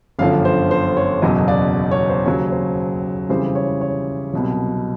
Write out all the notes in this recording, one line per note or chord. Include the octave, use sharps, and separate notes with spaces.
G1 F#2 D3 F3 F5
C5
C5
C#5
F#1 E2 B2 F#3 D#5
D5
C#5
C5
D#2 C#3 F#3 C#5
C5
F2 C#3 E3 G3 C5
C#5
C#5
C2 B2 F#3